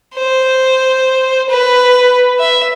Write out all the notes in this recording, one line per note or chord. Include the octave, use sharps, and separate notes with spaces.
C5
B4
E5